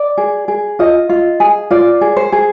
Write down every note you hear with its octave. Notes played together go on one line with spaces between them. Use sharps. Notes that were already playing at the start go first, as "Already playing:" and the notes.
Already playing: D5
G#4
G#4
F4 D#5
F4
G#4
F4 D5
G#4
C5
G#4